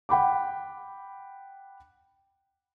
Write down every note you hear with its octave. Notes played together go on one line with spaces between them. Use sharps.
F#5 G5 B5 D6